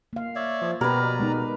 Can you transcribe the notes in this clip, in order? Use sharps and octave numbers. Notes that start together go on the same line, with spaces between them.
A#3 F5
C#5 D5 E5
F3
B2 G4 A#4 B4 D5 A#5
G#3 B3 D#4